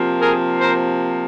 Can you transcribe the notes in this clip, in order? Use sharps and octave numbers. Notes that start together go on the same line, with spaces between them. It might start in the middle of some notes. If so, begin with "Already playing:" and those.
Already playing: C3 F3 A#3
G#4 A#4
A#4 C5